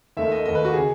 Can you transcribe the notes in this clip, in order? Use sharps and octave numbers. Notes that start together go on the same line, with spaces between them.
D#2 D#3 A3 E5
D#5
D#2 D#3 A3 D#5
B4
F#4
C#3 G#4